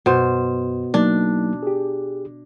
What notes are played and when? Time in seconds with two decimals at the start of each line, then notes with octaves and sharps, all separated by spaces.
0.06 F#2 B2 C5
0.94 F#3 A#3 D4 D#4
1.63 G4 G#4